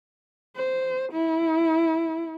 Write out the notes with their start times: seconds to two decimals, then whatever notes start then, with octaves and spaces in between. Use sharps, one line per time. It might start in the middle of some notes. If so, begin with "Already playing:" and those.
0.56 C5
1.12 E4